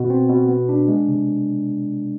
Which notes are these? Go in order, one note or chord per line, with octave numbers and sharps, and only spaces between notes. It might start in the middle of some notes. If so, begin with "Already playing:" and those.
Already playing: B2
C4
B2
B3
D4
G#3
C3